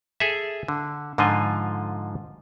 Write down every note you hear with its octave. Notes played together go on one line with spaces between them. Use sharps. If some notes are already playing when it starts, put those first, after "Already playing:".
G#4 A4 E5
D3
G#2 D3 F3 F4 D#5 G#5